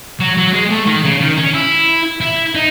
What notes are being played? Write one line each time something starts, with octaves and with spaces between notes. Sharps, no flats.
F#3
F#3
G#3
A3
D#3
C#3
D#3
C#4
E4
E4
D#4